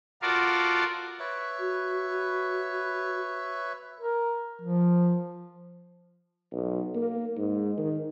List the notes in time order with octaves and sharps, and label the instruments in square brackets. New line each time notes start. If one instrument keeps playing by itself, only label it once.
[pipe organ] F4 F#4 A4 A#4 D5 F5
[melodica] B4 C#5 E5
[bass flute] F#4
[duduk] A#4
F3
[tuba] B1
A#3
G#2
D#3